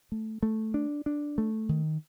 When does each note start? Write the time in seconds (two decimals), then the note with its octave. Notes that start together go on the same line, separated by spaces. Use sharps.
0.12 A3
0.43 A3
0.74 D4
1.06 D4
1.38 A3
1.69 D#3